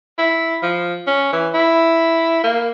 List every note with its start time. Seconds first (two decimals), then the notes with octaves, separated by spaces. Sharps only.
0.18 E4
0.62 F3
1.07 C#4
1.33 E3
1.54 E4
2.43 A#3